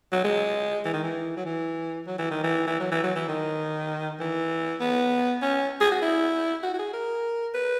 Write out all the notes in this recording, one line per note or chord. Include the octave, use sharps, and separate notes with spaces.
F#3
G#3
E3
D#3
E3
F#3
E3
F#3
E3
D#3
E3
E3
F#3
E3
F#3
E3
D#3
E3
B3
C#4
G#4
F#4
E4
F#4
F#4
G#4
A#4
B4